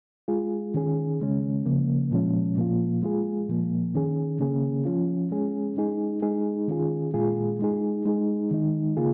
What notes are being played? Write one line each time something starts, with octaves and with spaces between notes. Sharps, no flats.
G#3 F4 G#4
D#3 C#4 G#4
C#3 G#3 C#4
C#3 F3 A#3
A#2 F3 G#3 C#4
A#2 F3 A#3 F4
G#3 F4 G#4
A#2 F3 A#3
D#3 C#4 G#4
C#3 A#3 C#4 G#4
F3 C#4 F4
G#3 C#4 G#4
G#3 D#4 G#4
G#3 D#4 G#4
D#3 C#4 F4 G#4
A#2 G#3 F4 G#4
G#3 D#4 G#4
G#3 D#4 G#4
D#3 G#3 D#4
C#3 A#3 F4 G#4